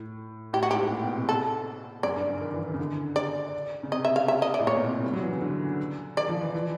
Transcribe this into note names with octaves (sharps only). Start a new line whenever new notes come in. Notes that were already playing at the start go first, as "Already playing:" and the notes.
Already playing: A2
A2 G4
F#4
G#2 G4
A2
A#2
B2
C3
A4
F#2 D5
G2
C#3
D#3
E3
D#3
C#3
D3
D5
C#3
C3 D#5
E5
F5
E5
D#5
D5
A2
A#2 C#5
B2
C3
G3
F#3
E3
C#3
D3
D#3 D5
F3
E3
E3